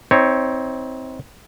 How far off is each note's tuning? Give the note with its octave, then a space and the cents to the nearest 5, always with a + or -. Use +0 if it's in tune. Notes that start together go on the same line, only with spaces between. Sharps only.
C4 +0 D#4 +40 C#5 +0